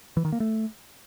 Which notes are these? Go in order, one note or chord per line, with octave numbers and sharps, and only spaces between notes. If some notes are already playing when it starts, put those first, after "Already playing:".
E3
D#3
A#3
A3